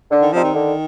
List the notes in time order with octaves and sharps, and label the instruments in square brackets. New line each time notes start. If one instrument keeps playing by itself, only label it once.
[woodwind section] D3
[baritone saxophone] D#3
[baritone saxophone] F3 [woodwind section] G3 C4 D#4
[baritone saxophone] D#3
[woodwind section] D3